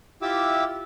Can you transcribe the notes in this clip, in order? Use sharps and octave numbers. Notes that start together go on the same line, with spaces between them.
E4 F4 G4 E5 D6 E6